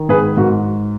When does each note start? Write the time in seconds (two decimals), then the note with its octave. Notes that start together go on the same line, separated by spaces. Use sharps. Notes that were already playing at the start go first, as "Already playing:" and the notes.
Already playing: D#3
0.09 G#2 G#4 B4
0.37 G#2 F#4 A#4